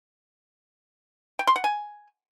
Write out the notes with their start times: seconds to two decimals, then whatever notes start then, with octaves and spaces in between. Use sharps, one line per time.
1.39 G5
1.47 C6
1.56 F#5
1.64 G#5